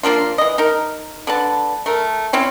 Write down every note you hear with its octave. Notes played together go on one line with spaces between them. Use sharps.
F3 A#3 D4 F4
E3 D#5
D#4 A#4
D3 B4 A5
A3 A#4
C4 C#4 E4